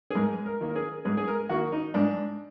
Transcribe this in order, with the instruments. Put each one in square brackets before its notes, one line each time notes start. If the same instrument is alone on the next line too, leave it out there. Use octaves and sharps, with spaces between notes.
[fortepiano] G#4
G#2 A#4
A#4
D#3 A#3
A#4
G#4
G#2 G#4
G#4
A#4
D#3 A#3 F#4
D#4
G#2 D4